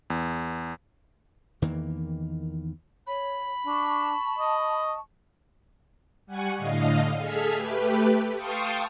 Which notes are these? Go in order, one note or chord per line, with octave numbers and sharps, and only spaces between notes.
E2
E2 D#3 E3 A#3
C#5 B5
D4 A5 C#6
D#5
G3 F#5 G#5 C#6
A2 D3 D#5 F5
G#4 A4 F6 G#6 B6
A3 G4 B4
F5 G5 A5 C6 C#6 D#6